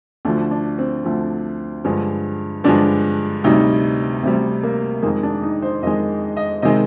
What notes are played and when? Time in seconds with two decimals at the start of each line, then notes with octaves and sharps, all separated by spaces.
0.25 D2 D3 F3 D4
0.51 D4
0.79 C4
1.05 D2 D3 F3
1.84 G2 D3 F3 G#3
2.64 G2 D3 F3 G#3 D4
3.44 D2 C3 G3 D#4
4.23 D2 C3 G3 C4
4.63 A#3
5.03 F2 D#3 G#3 A#3
5.23 D4
5.43 D#4
5.62 C5
5.82 F2 D#3 G#3 D#5
6.37 D#5
6.62 C3 D#3 G#3 D#5